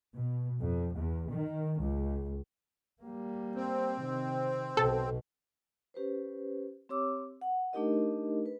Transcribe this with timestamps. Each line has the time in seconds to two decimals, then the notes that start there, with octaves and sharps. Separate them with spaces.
0.16 B2
0.61 F2
0.98 E2
1.33 D#3
1.81 C#2
3.02 G3 A#3
3.55 C4
4.01 C3 D#3
4.77 B1 B2 A4
5.94 C#4 G4 B4 C5
6.89 C4 G4 C#5 D6 E6
7.41 F#5
7.73 A3 D4 D#4 G4 A#4 D#5
8.46 B4